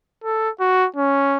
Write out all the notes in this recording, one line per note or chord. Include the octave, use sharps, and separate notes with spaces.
A4
F#4
C#4